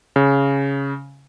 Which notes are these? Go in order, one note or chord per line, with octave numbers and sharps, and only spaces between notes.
C#3